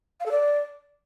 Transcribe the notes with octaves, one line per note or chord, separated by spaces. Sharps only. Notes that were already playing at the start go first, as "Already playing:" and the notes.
F5
A4
D5